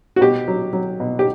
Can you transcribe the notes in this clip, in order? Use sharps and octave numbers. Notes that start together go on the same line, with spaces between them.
F#4
B2 G4
F#3
F#3
B2
G4